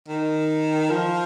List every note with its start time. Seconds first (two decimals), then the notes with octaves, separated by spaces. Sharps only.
0.08 D#3
0.90 F3